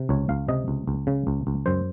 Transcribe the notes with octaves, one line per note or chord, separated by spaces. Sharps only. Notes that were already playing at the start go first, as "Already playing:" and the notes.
Already playing: C3
C#2 C#5
C#2 F5
C3 D#5
C#2
C#2
C#3
C#2
C#2
F#2 C5